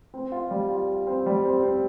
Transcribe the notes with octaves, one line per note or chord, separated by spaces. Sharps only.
C4
F4
G3
F4
F4
C4
G3
C4
C4